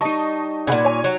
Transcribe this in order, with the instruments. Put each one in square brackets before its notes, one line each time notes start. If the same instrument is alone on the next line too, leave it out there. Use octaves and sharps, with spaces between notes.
[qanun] G3 D#4 [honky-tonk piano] D#5 A5 C#6
[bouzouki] A#2 C#3 [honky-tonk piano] F#5 B5 G#6
[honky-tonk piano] C#5 G#5
[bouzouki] F#3